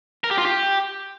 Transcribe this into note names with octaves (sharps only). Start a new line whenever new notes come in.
A#4
G4
F4
G4